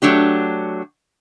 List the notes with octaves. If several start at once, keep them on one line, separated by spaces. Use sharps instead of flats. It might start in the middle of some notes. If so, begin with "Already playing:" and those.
F#3 A3 D4 G4